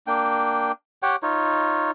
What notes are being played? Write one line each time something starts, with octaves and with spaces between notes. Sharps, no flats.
A#3 D4 G5
G4 C#5 F#5 G5
D#4 F4 C#5